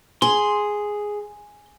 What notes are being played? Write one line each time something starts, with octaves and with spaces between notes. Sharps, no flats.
G#4 C6